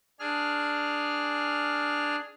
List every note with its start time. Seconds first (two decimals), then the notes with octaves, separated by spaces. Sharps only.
0.19 D4 G#4 F6